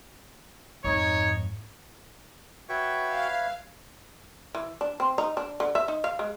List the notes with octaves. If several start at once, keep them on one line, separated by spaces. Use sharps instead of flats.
F2 G#2 D#4 C#5
F#4 B4 C#5 E5 G5 C#6
F5
E3
D4
C4
D#4
D4
D3
E5
D#4
F5
G#3